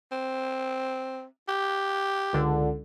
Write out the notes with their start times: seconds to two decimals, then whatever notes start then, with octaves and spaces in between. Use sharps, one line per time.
0.12 C4
1.48 G4
2.33 C#2 D3